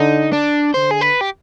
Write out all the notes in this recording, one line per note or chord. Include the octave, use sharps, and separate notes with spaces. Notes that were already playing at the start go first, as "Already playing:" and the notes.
Already playing: D3 D#4
D4
D3 C5
G#4
B4
G4